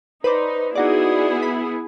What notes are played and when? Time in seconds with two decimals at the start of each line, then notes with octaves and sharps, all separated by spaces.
0.24 D#4 B4 C5 D5
0.75 B3 D#4 E4 F#4 G#4 D5
1.43 B5